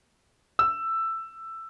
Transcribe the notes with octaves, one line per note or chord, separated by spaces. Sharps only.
E6